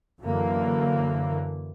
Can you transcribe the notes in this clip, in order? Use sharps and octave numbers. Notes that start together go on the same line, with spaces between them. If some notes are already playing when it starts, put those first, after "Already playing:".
F#2 D3 E3 A#3